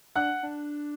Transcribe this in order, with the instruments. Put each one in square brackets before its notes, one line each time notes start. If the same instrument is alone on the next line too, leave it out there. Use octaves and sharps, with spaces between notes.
[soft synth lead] D4 [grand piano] F#5 F#6
[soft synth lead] D4